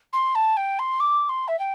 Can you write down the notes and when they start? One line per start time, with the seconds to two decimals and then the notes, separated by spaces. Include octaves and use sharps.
0.13 C6
0.35 A5
0.56 G5
0.79 C6
1.00 D6
1.29 C6
1.48 E5
1.59 G5